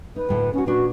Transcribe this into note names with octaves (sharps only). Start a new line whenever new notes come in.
D#4 B4
D2 A2 A4
C#4 D#4 F#4
A#2 D4 F#4 B4